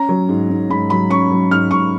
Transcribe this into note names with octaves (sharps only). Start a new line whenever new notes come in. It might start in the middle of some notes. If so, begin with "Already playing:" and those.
Already playing: C#4 A#5
F#3
G#2
G#2
G#2 B5
F#3 B5
C#4 C#6
F#3
G#2 F6
G#2 C#6